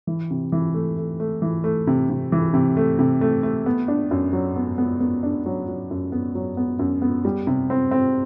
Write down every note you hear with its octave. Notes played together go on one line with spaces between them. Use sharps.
E3
C3
E3
A3
A3
A3
E3
A3
C3
C3
E3
C3
A3
C3
A3
A3
B3
D4
F#2
F#3
B3
B3
B3
D4
F#3
F#3
F#2
B3
F#3
B3
F#2
B3
G3
C3
C4
C4